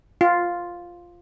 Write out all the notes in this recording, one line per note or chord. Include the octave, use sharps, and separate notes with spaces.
F4